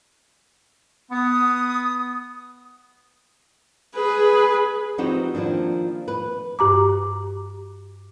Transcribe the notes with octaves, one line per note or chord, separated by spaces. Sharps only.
B3 D#6
G#4 B4
F3 C4 D#4 F#4 G4
D#3 F3 A#3 D4 E4
B4
G2 G4 A#5 D6